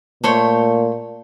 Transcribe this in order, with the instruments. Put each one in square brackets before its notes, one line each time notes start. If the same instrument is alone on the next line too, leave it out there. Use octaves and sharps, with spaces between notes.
[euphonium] A#2 [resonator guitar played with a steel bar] A3 C5 C#5